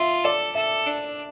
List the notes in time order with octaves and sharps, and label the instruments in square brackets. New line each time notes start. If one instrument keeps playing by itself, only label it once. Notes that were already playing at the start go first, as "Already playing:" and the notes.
Already playing: [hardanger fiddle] F4 [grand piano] E5
[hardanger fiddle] A4 [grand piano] D5
[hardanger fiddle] A4 [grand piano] E5
[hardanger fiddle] D4